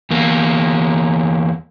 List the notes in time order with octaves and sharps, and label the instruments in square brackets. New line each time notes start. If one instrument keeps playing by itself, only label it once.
[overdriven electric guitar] E2 A#3